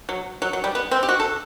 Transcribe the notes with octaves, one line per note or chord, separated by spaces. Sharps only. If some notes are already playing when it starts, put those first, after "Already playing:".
F#3
F#3
F#3
G3
B3
C4
G4
F#4
A4